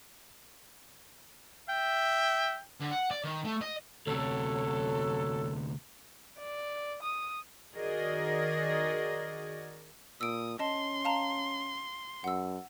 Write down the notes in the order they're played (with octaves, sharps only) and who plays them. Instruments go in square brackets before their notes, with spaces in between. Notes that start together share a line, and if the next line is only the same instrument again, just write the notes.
[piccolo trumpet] E5 [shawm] G5
[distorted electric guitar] D3
F#5
D5
D#3
A3
D#5
[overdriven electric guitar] D2 C3 [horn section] F#3 A4
[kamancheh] D5
D#6
[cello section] D#3 F#4 G#4 A#4 D5 D#5
[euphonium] A#2 [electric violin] D#6 [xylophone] E6 D7
[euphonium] C#4 [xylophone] D#5 A5 [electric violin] C6
[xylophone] F5 A5 A#5
[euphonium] F#2 [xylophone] F#5 E6